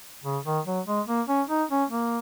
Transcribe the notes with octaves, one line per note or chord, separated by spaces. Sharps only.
C#3
D#3
F#3
G#3
A#3
C#4
D#4
C#4
A#3